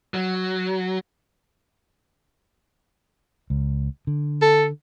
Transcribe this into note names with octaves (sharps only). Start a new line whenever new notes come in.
F#3
C#2
D3
A4